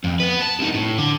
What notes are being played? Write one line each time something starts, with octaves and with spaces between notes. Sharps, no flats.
F2
B3 B4
A5
C2 D#4
A2
D3